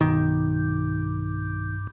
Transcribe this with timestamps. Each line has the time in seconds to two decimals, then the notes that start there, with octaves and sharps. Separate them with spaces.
0.01 B1 G2 D#3